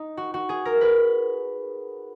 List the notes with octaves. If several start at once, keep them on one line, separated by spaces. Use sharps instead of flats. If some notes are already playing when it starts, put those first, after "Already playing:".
Already playing: D#4
F#4
F#4
G#4
A#4
B4